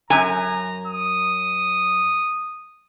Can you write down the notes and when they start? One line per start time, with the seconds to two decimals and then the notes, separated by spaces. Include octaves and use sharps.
0.10 F#2 G#5 A#5
0.87 D#6